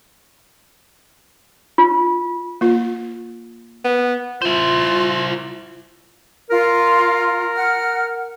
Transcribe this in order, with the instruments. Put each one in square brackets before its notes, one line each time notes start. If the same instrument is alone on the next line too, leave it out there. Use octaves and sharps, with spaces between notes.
[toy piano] F4
[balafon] A#3 F4
[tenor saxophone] B3
[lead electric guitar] E4 C5 [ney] F4
[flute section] F4 [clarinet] A#4
[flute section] F#5 F6